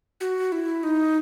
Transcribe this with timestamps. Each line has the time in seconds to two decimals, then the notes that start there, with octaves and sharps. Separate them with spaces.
0.20 F#4
0.52 E4
0.83 D#4